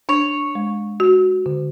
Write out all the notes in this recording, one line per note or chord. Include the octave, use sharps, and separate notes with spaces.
D4 C#5
G#3
F#4
D3